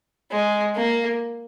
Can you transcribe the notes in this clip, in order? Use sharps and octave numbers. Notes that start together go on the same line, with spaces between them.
G#3
A#3